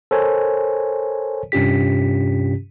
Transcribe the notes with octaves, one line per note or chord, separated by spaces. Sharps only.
A4 A#4 C5 C#5 G#5
G2 C3 C#4 F4 G4 B6